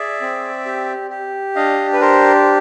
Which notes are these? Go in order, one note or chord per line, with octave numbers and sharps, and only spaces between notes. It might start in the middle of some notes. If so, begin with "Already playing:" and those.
Already playing: G#4 D5 E5
C4
G4
G4
D4 D#5 F5
B4
G4 A#4 C5